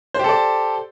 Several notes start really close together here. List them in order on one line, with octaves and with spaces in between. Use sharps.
C5 G4 A4 D5